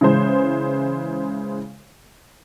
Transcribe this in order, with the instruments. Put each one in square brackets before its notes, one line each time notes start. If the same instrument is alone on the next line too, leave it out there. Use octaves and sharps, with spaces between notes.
[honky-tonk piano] C#3 E3 G#3 C5